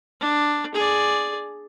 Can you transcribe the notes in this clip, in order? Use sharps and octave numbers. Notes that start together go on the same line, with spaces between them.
D4
G#4 D5